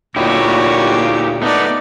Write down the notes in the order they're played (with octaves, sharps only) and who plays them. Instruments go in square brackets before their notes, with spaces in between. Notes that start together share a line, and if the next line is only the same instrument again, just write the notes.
[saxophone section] D2 A#2 [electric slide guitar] D#4 E4 G4 [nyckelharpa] F#4 C#5
[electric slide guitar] A3 B3 [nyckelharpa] D#4 D5